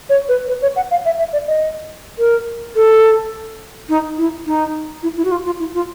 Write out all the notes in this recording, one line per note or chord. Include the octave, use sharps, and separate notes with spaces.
C#5
B4
B4
C#5
F#5
F5
E5
E5
D5
D#5
A#4
A4
D#4
E4
D#4
E4
E4
F#4
F4
F4
E4
F4